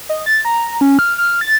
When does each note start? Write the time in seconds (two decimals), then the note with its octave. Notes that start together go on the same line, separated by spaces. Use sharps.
0.09 D#5
0.26 A6
0.45 A#5
0.81 C#4
0.99 F6
1.18 F6
1.41 A6